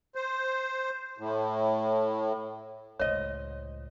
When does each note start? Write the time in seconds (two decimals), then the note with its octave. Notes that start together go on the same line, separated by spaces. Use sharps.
0.15 C5
1.18 A2
2.99 C#2 A2 C5 C#5 D#5